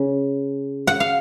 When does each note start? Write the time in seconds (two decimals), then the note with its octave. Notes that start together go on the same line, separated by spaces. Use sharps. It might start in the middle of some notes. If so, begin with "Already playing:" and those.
Already playing: C#3
0.87 F#5
1.00 F5